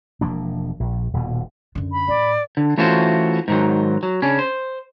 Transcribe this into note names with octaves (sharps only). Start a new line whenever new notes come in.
E1 F3 A#3 D4
A#1
D#1 B2
F#2 D3
B5
A2 D5
D3
E3 A3 C#4 F4 F#4 C5
G#2 D#3 F#3
F#3
C#3 C#4 D4
C5